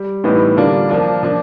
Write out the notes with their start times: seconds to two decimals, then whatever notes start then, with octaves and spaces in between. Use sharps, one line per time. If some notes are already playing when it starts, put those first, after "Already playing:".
Already playing: G3
0.24 A2 E3 G3 B3 D#4
0.56 D3 G3 A#3 D4 F4
0.89 F3 A#3 D4 F4
1.23 F3 A#3 D4